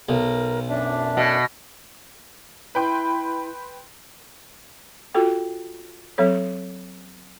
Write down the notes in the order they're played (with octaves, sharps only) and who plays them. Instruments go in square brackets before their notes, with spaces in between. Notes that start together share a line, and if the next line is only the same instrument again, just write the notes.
[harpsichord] B1 [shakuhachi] A#4
[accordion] F#2 D4 [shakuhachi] E5
[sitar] B2
[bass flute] E4 [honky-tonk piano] B4 G5 C6
[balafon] F4 F#4 A4 G5
F#3 C4 A4 C#5